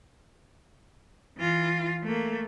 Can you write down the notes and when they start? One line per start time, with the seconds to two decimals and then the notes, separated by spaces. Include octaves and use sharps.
1.38 E3 F4
2.03 A3 A#3